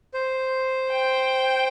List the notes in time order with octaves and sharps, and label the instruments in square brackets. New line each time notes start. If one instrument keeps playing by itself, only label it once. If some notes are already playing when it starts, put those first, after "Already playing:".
[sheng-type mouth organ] C5
[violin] G5